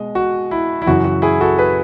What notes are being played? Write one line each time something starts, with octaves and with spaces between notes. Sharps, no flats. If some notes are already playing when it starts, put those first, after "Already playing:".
Already playing: B2 G#3 D#5
F#4
E4
E4
F#2 C#3 E3 F#4
F#4
E4 G#4
F#4 A4
G#4 B4